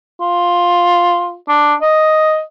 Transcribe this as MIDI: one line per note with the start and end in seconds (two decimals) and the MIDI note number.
0.21 1.35 65
1.49 1.75 62
1.82 2.42 75